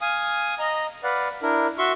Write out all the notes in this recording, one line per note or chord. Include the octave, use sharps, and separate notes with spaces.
F5 G#5 D#6
D#5 A#5
B4 D5 F5 F#5
D4 E4 A#4
F#4 E5 C6 C#6